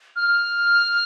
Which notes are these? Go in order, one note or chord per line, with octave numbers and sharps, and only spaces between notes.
F6